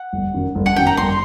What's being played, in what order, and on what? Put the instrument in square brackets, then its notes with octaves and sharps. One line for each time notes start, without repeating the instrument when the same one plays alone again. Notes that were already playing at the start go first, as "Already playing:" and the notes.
Already playing: [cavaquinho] F#5
[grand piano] G1
F#2 D#3
G1
[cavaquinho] F#5
[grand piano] F#2 D#3 [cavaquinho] G5
[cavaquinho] A#5
[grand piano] G1 [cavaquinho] C6